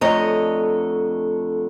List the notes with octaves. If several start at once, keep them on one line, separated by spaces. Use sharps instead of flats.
F2 D3 A3 C#5 D#5 A#5